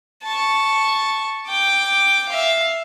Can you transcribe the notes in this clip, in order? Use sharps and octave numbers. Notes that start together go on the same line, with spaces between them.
A5 C#6
G5 D6
E5 F5